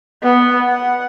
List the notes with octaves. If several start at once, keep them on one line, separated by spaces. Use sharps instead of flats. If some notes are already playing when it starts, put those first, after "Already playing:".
B3
F#5